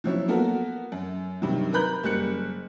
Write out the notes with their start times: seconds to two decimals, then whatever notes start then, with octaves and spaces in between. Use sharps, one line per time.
0.04 F3 F#3 C#4 E4
0.28 A#3 B3 F#4 A4 A#4
0.92 F#2
1.42 G2 C3 D#3 F#3
1.73 A#4 B4 A#5 B5 F#6 G6
2.03 F#1 G3 A#4 F#6 C#7